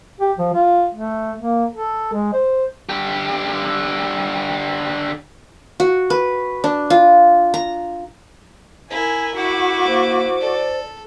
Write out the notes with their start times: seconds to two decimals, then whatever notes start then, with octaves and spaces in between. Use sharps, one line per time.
0.21 G4
0.39 F3
0.54 F4
0.95 A3
1.39 A#3
1.71 A4
2.13 G#3
2.34 C5
2.89 D3 G4
5.80 F#4
6.10 B4
6.64 D4
6.90 F4
7.54 A#5
8.91 E4 A#4 G#5
9.36 E4 F#4 F#5 D6
9.87 A#3 C5
10.41 A4 D5